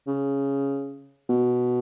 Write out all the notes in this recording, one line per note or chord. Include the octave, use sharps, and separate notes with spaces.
C#3
B2